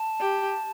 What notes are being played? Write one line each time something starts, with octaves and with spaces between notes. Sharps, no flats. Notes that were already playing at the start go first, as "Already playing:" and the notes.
Already playing: A5
G4